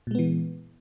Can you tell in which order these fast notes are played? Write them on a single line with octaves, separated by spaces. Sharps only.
A#2 G#3 B3 E3